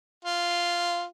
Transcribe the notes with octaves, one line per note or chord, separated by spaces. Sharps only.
F4